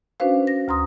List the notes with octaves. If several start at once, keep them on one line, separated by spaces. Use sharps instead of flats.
C#4 D4 F#4 B4 C5 F5
A#6
D2 A#5 C6 D#6